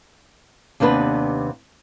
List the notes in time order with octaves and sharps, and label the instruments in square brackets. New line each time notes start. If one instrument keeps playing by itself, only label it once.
[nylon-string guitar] D#2 C3 B3 D4 B4